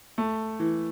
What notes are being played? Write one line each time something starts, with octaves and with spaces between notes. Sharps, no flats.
A3
E3